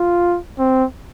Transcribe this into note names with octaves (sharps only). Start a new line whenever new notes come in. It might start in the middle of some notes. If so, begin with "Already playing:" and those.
Already playing: F4
C4